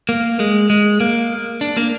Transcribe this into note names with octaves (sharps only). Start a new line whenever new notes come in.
A#3
G#3
G#3
A#3
D4
A#3